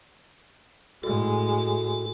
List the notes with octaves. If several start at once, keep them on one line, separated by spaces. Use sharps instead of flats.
A2 G#3 F#4 A4